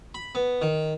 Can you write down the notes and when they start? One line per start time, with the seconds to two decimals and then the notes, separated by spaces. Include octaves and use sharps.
0.15 B5
0.35 B3
0.62 D#3